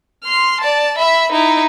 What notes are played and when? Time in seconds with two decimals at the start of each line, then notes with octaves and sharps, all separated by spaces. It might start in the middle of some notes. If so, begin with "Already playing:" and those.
0.24 C6 F6
0.61 D5 A5
0.98 E5 B5
1.32 D#4 E4